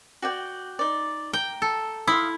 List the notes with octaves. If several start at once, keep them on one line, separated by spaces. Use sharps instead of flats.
F#4 D5 G5
D#4 D5
G5 A#5
A4
E4 F5 C6 D#6